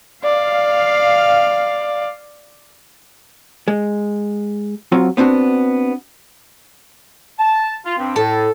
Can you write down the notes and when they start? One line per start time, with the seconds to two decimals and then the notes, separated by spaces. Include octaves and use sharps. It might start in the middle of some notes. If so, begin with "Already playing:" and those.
0.24 D5 F5
3.68 G#3
4.92 F#3 C4 F4 F#4
5.17 B3 C4 D4 F4 F#4
7.39 A5
7.85 F4
7.98 G2 C4
8.16 A2 A4